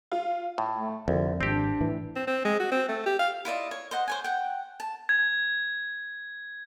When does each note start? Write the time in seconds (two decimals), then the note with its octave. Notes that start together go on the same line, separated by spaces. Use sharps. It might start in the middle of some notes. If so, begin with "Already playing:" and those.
0.12 F4
0.58 A2
0.77 A3
1.08 C2 F2 D3
1.41 G#1 C4 D4 G4
1.81 A2 E3
2.16 C4
2.27 C4
2.45 G#3
2.60 F#4
2.72 C4
2.88 A3
3.06 G4
3.19 F5
3.45 E4 F4 D5 D#5
3.71 C#5
3.91 C5 D#5 F#5
4.08 C5 C#5 G#5
4.24 F#5 G5
4.80 A5
5.09 G#6